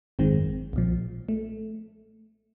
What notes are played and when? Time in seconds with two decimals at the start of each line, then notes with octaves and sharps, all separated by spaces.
0.19 G#1 F#2 D#3 G#3 C4
0.73 B1 A#2 F3
1.29 A3